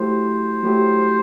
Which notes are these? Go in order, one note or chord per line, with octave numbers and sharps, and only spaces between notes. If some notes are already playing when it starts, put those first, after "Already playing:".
Already playing: F#3 A3 E4 G4 C5
F#3 A3 E4 G4